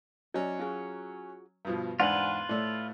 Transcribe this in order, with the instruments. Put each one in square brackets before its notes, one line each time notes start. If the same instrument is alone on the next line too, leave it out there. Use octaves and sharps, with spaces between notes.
[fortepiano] F#3 C#4 [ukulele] D5 D#5
[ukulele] F4 F#4 G#4
[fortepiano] G2 B2 F3
[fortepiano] E2 G#2 D4 [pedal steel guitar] F4 B4 [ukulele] F#5
[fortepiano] A2 A3 [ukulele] D5